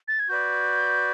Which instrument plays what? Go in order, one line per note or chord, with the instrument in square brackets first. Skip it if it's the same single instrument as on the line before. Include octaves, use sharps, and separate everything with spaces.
[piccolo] A6
G#6
[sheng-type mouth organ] F#4 B4 D5 [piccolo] G6